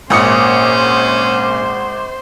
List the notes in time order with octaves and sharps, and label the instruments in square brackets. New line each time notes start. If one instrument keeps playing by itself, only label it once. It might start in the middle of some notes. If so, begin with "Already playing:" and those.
[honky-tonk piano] G#1 D#6 C#7 [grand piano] A#2 [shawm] C#4 [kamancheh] C5